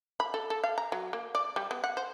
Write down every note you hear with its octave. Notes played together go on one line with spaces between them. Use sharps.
B5
A4
A4
F5
A#5
F#3
A#3
D5
G3
B3
F#5
C5